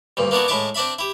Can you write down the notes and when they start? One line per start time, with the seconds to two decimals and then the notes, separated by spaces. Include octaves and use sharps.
0.17 D2 G2 A#2
0.31 A#3 B3 D4 E4 F#4
0.48 A2 G#3 E4 E5 A5 D6
0.75 C4 D4 D5 E5 B5
0.99 E4 G4